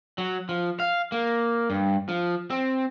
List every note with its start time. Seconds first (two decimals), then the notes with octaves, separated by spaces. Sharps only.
0.18 F#3
0.49 F3
0.80 F5
1.12 A#3
1.70 G2
2.09 F3
2.50 C4